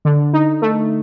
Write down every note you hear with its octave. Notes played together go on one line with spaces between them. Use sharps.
D3
D#4
A3